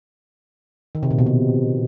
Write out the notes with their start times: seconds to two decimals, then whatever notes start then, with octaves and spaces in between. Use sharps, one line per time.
0.95 D#3
1.03 C3
1.11 A#2
1.19 B2
1.26 C3